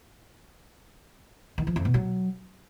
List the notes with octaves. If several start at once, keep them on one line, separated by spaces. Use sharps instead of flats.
D#3
F3
F2
B2
F#3